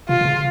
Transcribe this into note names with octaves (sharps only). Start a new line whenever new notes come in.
C3 F4
C3
C#3